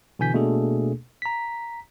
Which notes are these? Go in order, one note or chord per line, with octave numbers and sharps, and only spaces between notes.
B2 D3 E3 G#5 G6 B6
B2 A3 A#3 D4 G#4 A4
A#5 B6